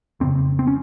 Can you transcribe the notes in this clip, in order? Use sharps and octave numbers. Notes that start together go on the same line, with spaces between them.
F2 C#3 C4
C4
C#4